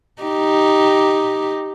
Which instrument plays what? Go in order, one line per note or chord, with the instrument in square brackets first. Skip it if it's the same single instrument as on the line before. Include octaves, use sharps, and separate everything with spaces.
[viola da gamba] D#4 G4